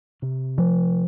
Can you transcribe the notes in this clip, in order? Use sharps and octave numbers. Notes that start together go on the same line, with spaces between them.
C3
F3